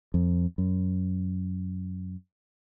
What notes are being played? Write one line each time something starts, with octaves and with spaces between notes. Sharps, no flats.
F2
F#2